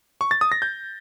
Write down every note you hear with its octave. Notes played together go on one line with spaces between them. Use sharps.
C#6
A6
D#6
A#6
G6